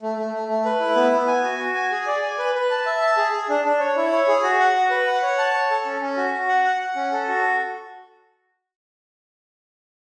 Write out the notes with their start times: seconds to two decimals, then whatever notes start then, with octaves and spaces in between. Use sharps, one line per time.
0.02 A3
0.18 A3
0.33 A3
0.48 A3
0.65 B4
0.80 E4
0.96 B3
1.11 B3
1.28 G#5
1.44 F#4
1.59 F#4
1.75 G#5
1.91 G#4
2.07 D5
2.22 G#5
2.38 B4
2.55 B4
2.70 A5
2.86 E5
3.02 A5
3.17 G#4
3.32 G#4
3.49 D4
3.65 D4
3.80 C#5
3.97 E4
4.13 C#5
4.28 G#4
4.43 F#4
4.59 F#5
4.76 F#4
4.90 B4
5.07 F#5
5.23 C#5
5.38 A5
5.54 C#5
5.71 A4
5.85 C#4
6.01 C#4
6.17 F#4
6.34 F#4
6.48 F#5
6.64 F#5
6.81 F#5
6.96 C#4
7.12 A4
7.28 F#4